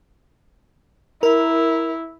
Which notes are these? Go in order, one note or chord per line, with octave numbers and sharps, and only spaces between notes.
E4 A#4